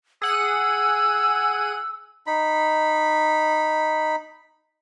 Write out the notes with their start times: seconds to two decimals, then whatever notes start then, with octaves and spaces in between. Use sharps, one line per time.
0.22 G#4 F#5 E6 D#7
2.27 D#4 B5